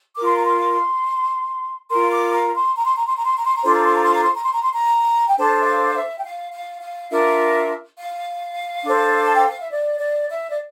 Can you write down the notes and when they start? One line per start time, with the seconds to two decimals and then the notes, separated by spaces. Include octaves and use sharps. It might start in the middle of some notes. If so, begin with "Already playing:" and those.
0.15 F4 A#4 D6
0.26 C6
0.36 A#5
0.46 C6
1.89 F4 A#4 C6
2.11 D6
2.33 A#5
2.55 C6
2.76 A#5
2.86 C6
2.96 A#5
3.06 C6
3.15 A#5
3.25 C6
3.36 A#5
3.46 C6
3.54 A#5
3.63 D4 F4 A4 C5 C6
3.75 A#5
3.85 C6
3.94 A#5
4.04 C6
4.14 A#5
4.23 C6
4.33 A#5
4.43 C6
4.53 A#5
4.62 C6
4.72 A#5
5.27 G5
5.37 D4 A4 C5 A5
5.59 E5
5.66 F5
5.89 F5
5.94 E5
6.16 G5
6.24 F5
6.52 F5
6.82 F5
7.10 D4 F4 A#4 E5
7.98 F5
8.84 D4 A4 C5
9.22 A5
9.34 G5
9.47 F5
9.58 E5
9.71 D5
10.00 D5
10.29 E5
10.50 D5